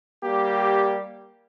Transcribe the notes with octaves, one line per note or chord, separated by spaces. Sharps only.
G3 A#3 G4